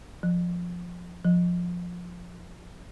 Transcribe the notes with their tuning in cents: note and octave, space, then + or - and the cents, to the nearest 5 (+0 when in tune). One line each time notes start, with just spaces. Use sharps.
F3 +10
F3 +15